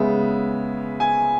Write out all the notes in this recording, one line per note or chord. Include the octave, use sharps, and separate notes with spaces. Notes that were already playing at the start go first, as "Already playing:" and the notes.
Already playing: C#3 G#3 B3 E5
G#5